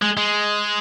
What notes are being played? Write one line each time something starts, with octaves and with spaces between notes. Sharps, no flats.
G#3
G#3